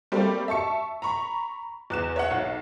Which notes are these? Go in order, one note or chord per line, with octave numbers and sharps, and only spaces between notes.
G3 A3 A#3 C4 G4
E5 A5 C#6 C#7
A#5 B5 C#6
E2 F#6 E7
C#5 E5 F#5
B1